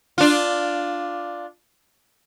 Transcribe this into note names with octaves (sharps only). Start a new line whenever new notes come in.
D4 F4